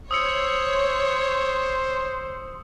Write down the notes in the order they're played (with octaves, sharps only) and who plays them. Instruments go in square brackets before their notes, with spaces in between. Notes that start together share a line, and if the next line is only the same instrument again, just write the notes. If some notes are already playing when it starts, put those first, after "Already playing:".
[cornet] C5 [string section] C#5 [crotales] D#6 E6 C#7